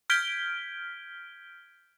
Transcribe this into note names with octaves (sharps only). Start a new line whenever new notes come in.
F6 G6 G#6 B6 D7 G7